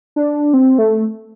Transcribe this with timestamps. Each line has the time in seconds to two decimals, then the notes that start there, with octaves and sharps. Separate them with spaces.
0.16 D4
0.54 C4
0.78 A3